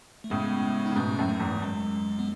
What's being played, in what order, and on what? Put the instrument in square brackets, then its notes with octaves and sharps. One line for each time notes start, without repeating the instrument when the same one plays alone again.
[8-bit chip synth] A3
[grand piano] A2 C#3 [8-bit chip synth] G#3 B3
[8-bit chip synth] D#4
[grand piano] C#3
[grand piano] G#2 B2 [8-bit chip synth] A3 C#4
[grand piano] F#2 A2
[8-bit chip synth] A3
[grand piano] E2 G#2
[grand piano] F#2 [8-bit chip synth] G#3
[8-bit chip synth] B3